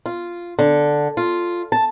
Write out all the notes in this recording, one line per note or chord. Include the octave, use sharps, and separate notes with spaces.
F4
D3
F4
A5